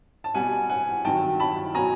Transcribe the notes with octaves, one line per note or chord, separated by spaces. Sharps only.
A5
B2 G3 F#5 G#5
F#5 G#5
G2 D#3 F#3 G5 A5
A5 B5
B2 F#3 G#5 A#5